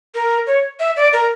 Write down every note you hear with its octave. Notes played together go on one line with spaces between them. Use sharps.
A#4
C#5
E5
D5
A#4